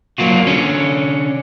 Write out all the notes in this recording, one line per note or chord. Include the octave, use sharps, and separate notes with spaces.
F#3 A#3 F4 F#4
D3 C#4